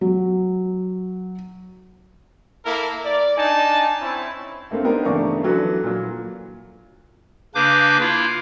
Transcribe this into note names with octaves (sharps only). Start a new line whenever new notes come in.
F#3
A#3 E4 A4 A#4
D5
D4 D#4 G#5 A5
C4 C#4 E4
G2 A3 A#3 C4
B3 D4 D#4 G4 A#4 C5
E2 G2 C#3 A3 D5 C#6
D3 E3 F#3 F#4 A4 B4
A#2 F#3
C#3 A#3 D4 B4 D6 G6
E4 F4 F5